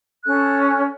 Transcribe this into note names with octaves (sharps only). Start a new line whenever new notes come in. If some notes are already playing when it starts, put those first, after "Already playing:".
C#4 A4 F#6